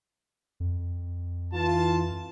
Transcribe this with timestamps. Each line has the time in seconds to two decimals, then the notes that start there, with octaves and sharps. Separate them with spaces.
0.60 F2
1.54 E3 F4 A5